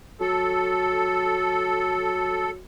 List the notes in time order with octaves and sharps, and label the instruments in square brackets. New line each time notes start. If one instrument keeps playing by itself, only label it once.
[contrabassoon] F#3 [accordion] A4